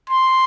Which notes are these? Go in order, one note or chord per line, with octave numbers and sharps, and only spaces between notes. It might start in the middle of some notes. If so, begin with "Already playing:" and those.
C6